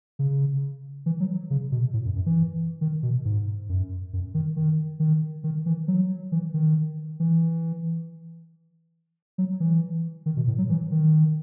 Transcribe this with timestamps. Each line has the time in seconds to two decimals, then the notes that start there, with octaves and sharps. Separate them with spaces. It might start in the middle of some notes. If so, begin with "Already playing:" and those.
0.19 C#3
1.06 E3
1.20 F#3
1.50 C#3
1.72 B2
1.93 A2
2.05 F#2
2.16 F#2
2.26 E3
2.81 D#3
3.03 B2
3.25 G#2
3.69 F#2
4.13 F#2
4.34 D#3
4.56 D#3
5.00 D#3
5.44 D#3
5.66 E3
5.88 F#3
6.32 E3
6.54 D#3
7.20 E3
9.38 F#3
9.60 E3
10.26 D#3
10.37 B2
10.47 A2
10.58 F#3
10.69 E3
10.91 D#3